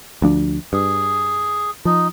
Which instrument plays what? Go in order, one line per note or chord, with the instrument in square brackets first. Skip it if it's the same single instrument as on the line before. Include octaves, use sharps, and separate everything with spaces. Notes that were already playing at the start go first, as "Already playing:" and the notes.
[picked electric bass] D2 F3 D4
[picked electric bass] G2 [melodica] G#4
[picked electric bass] F3 [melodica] D#4